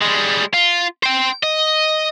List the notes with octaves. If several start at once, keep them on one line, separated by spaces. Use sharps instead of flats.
G3 G#3
F4
C5 G5
D#5